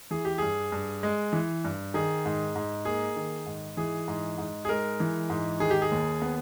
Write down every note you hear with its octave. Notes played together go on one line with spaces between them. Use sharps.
E3 G#4
G4
G2 G#4
G2
G#3
E3
G2
D#3 G#4
G#2
G#2
A#3 G#4
D#3
G#2
E3 G#4
G#2
G#2
G#4
G#3 A#4
E3
G#2
D#3 G#4
G4
G#4
D#2
B3